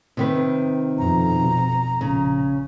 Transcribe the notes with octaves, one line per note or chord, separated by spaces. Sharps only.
C3 D#3 B4
F2 B2 A#5
A#1 C#3